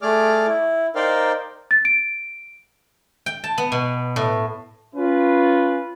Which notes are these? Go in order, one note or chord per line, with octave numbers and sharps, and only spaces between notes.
A3 G#4 D5 D6 F6
E4
D#4 A#4 C5 D5 F5 G5
A6
D7
G5
A5
B3
B2
A2
C#4 F4 B4